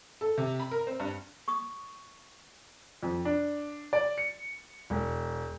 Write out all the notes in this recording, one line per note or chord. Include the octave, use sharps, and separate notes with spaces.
A4
C3
B5
A#4
C4
G2
C#6 D#6
F2
D4
D5
C#7
E1